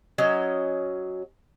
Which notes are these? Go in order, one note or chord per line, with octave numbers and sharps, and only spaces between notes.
F#3 C#4 D#5